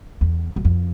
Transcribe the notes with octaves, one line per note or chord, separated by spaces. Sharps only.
E2
F#2
F2